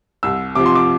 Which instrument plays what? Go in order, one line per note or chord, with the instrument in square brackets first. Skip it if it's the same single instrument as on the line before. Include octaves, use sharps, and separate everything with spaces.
[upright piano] C2 [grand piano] E6
[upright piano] C3 F3 [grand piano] D6
[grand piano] C6
D6